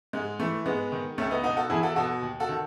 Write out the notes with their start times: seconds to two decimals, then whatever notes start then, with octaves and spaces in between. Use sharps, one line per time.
0.13 G#2 G#3
0.39 E3 A3
0.66 G#2 G#3 B3
0.92 D#3
1.18 C#2 A3 C#4
1.31 B3 D#4
1.43 B2 D#4 F#4
1.57 F#4 A4
1.70 E2 E4 G#4
1.83 F#4 A4
1.96 B2 F#4 A4
2.22 D#2
2.40 F#4 A4
2.49 D#3